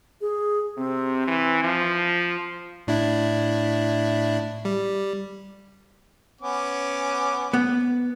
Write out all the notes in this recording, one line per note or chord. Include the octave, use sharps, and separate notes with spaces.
G#4
C3 C4
E3
F3
A2 D4 E4
G3
B3 C#4 D6
B3